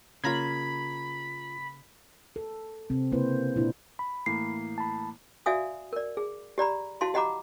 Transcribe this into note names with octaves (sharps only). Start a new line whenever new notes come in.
C#3 A#3 F4 A#5 B5 G#6
A4
C3 C4
C#3 A#3 E4 B4 C5
A#2 D4 E4
B5
A2 E3 A#3 C7
A5 B5
F#4 D5 E5 F5 G#5 D#6
A#4 D5
G#4
G4 D5 A#5 B5
E4 F#4 F5 A5 C6
G4 D#5 F#5 A#5 B5 D6